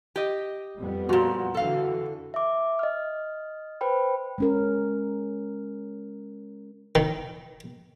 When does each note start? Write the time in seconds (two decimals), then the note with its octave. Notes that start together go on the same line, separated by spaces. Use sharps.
0.16 G4 D#5
0.78 F2 G3 B3
1.09 A#2 F3 F#4
1.54 D3 E3 A4 F5
2.34 E5 D6
2.79 D#5 F6
3.81 B4 C5 G5 B5
4.38 G#3 C#4 A#4
6.95 D#3